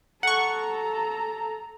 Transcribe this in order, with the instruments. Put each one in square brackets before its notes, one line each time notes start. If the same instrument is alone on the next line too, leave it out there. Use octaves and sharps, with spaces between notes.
[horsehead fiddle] A4 A#5 [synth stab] F#5 C#6